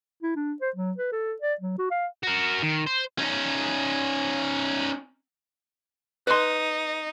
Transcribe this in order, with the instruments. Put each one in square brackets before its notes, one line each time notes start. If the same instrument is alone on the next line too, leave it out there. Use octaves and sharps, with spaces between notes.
[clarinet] E4
D4
C5
F#3
B4
A4
D5
F#3
F#4
F5
[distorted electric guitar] F#4 A#4
D#3
C5
[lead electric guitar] C#4 D#4
[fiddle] D#4 [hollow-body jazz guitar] B4 C6